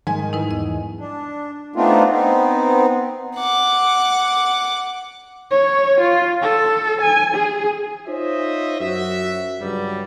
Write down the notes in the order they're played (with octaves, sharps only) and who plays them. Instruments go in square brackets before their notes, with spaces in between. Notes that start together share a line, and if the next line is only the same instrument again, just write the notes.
[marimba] G#2 [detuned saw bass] D#3 [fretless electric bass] F3 G3 G#3 [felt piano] G#5
[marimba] D#4 E4 B4
[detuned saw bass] E2 [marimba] D#5
[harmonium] D4
A3 B3 C4 D4 D#4 F4
B3 C4 D#4
[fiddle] F#5 D6
[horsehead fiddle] C#5
F4
A4
G#5
G#4
[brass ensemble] D#4 F4 C5 C#5 D#5 E5
F#2 F#4 E5
C#2 G2 F#3 G3